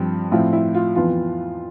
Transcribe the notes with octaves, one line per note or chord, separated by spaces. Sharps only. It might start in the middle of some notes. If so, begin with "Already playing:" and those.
Already playing: G2 F3 C4
A2 F3 C4 E4 F4
E4
F4
F2 E3 B3 F4